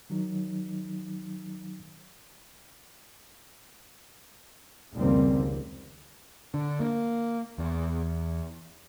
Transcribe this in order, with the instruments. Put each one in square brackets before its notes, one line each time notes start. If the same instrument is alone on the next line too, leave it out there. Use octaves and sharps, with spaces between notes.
[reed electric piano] D#3 F#3 D#4
[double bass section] F1 C#2 D#3 G3 A#3 C4
[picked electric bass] D3
A#3
E2